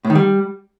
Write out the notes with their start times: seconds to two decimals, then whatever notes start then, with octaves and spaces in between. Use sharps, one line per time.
0.05 A2
0.10 D#3
0.15 G3